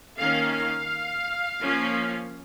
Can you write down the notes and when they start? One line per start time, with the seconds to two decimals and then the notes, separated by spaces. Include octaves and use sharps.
0.18 D#3 A#3 C#4 F5
0.54 F5
1.61 F3 A#3 C#4